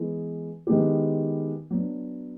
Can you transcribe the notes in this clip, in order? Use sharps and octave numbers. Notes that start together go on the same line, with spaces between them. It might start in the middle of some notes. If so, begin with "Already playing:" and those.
Already playing: E3 G#3 B3 E4 G#4
D#3 G#3 B3 E4 G4
F#3 B3 D4